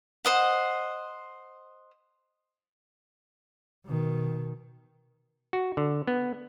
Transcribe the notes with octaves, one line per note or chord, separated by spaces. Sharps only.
C5 D#5 F#5
B2 D#3
F#4
D3
B3